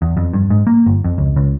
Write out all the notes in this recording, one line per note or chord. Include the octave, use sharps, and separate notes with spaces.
E2
F2
G2
G#2
A#3
G1
F2
C#2
C#2